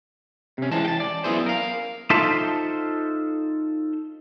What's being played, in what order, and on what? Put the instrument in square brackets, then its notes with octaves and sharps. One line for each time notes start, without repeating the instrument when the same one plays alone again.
[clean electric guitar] C3 C#4
E3 G#3 C4 A5
G5 A5
D5
F#2 B3 E4 G#4 C5
A#4 F5
D#4 F4 A4 C5 E5 A5